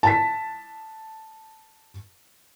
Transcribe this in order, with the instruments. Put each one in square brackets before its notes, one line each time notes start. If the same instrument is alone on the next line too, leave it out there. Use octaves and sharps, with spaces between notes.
[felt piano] A5 B6